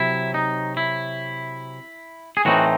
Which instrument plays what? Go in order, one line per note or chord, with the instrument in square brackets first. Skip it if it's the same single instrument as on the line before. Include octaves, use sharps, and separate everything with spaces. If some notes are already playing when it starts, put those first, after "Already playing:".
Already playing: [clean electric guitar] C3 F#3 E4
D#4
E4
G#4
A2 E3 C4 D#4 F#4